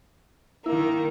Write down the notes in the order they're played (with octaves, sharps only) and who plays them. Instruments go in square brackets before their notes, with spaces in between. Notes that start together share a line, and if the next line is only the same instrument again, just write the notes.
[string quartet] D#3 A#3 [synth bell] E4